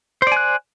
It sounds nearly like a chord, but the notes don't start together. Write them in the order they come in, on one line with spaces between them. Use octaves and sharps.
C5 D5 G#5 F#6